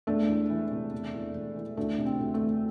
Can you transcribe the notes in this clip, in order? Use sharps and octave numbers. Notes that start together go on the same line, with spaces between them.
E1 A3 D4
E2
E3
C3
E1
E2
E1
E3
D2 A3 D4
C3
C4
D2
A3
E3